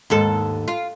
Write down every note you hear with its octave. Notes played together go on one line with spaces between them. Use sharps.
D#2 G#2 A4
F4